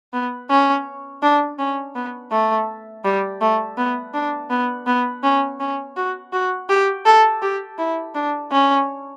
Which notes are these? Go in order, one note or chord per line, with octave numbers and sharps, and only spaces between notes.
B3
C#4
D4
C#4
B3
A3
G3
A3
B3
D4
B3
B3
C#4
C#4
F#4
F#4
G4
A4
G4
E4
D4
C#4